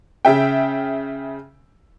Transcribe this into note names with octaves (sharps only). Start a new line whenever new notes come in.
C#3 E5 G5